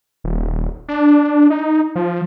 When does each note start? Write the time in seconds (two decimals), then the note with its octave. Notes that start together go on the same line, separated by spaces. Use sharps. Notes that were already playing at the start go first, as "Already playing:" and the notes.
0.24 D#1
0.88 D4
1.50 D#4
1.95 F3